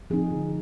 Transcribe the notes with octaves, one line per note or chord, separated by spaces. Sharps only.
F3 C4 D#4 G#4
D3